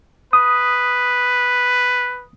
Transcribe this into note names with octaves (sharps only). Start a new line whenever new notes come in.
B4 D#6